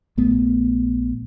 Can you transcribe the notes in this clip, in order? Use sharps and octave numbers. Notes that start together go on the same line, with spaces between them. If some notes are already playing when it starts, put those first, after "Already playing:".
A#1 A3 B3